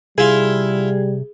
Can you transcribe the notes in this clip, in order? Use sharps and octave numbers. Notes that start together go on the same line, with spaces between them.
C3 G3 E4 F4 G#4